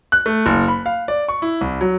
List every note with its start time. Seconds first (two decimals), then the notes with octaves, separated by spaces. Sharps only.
0.12 F#6
0.26 A3
0.46 F#1
0.68 B5
0.86 F5
1.08 D5
1.29 C#6
1.42 E4
1.61 C2
1.81 F#3